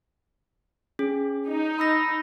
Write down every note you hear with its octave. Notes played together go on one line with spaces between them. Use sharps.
C#4 G#4
D#4
B5 E6 A#6